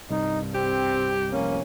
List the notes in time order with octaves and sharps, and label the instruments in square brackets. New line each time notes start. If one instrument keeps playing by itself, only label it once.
[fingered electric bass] C2 [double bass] G2 [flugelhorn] D#4
[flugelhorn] C4 [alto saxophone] G4
[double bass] F1 C#4 [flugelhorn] A#3